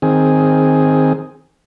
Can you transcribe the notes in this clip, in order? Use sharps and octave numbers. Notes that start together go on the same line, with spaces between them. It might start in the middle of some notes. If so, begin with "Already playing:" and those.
D#3 C4 G#4